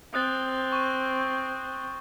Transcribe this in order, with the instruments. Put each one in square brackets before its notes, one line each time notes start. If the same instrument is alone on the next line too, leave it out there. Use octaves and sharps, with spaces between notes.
[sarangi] C4 [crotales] D#6 F#6 A6
[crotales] C#6 D#7